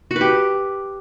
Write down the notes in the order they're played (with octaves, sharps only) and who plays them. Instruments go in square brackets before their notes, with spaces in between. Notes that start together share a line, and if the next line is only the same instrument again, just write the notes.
[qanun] F#4
B4
G4